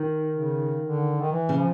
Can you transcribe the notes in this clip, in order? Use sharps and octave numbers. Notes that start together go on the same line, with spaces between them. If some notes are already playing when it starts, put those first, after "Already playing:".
Already playing: D#3
C#3
D3
D#3
E3
C#3
F3